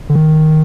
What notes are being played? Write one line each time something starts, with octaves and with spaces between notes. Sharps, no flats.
D3
D#3